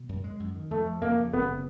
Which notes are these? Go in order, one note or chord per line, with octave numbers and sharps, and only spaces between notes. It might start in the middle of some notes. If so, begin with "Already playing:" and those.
Already playing: B2
F#2
G#3
F#2
D#3
F2 A3
F3
F2 A#3
C#3
F#1 B3
C#3